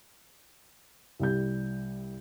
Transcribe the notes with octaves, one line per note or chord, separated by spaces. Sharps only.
C2 G3 G6